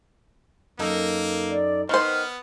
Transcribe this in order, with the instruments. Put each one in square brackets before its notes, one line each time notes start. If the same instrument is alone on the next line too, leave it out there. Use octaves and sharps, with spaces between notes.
[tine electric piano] F#2 D#4 A4 [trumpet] A#3
[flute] D5
[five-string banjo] D#3 C5 [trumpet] B3 [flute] F6